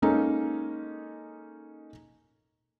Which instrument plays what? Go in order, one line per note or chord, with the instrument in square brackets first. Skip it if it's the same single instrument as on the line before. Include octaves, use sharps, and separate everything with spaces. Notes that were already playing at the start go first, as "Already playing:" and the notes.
[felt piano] G#3 A#3 C#4 D#4 A4